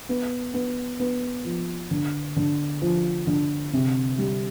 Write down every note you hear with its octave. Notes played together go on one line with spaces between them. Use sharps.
B3
B3
B3
F3
D3
D3
F3
D3
C3
G3